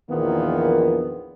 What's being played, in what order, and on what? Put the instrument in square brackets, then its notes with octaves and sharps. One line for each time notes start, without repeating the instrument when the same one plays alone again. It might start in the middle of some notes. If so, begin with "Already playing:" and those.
[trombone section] A#1 E2 D#3 F3 A#3 B3